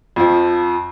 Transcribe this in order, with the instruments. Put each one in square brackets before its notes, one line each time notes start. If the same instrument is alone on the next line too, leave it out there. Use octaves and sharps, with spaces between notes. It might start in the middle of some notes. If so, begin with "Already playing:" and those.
[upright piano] F2 F3